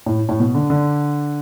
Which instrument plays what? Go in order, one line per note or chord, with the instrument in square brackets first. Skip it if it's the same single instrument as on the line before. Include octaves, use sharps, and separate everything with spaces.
[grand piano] A2
A2
B2
D3
D3